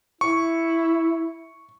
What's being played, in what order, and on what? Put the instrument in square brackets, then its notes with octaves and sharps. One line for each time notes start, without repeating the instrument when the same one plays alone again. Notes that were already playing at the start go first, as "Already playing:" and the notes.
[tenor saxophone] E4 [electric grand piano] C#6